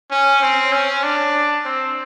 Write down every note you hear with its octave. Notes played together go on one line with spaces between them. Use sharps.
C#4
C4
C#4
D4
C4